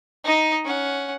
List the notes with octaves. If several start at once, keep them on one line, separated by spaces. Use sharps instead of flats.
D#4 D#5
C#4 F#5